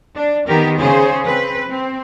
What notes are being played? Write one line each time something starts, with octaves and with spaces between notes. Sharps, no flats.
D4
D#3 B3 G4 A#4
C#3 G#4 C5
C4 B4
C4